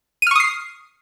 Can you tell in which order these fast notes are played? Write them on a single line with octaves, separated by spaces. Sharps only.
D#7 F6 C#6 D#6 C7